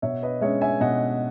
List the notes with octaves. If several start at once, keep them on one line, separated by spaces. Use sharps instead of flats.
B2 C#5 E5
B4 D#5
G#3 C#4 C#5 E5
E5 G#5
B2 D#5 F#5